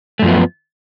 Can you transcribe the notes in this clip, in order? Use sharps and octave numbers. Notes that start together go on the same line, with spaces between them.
F#2 F3 A3 B3